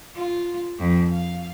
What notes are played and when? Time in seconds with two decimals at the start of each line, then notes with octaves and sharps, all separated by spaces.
0.16 F4
0.79 F2
1.12 F5